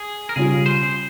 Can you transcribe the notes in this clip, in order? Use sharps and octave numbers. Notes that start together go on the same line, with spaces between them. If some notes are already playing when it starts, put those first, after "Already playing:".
Already playing: G#4
A#4
C#3 G3 C#4 F4 G#4
C5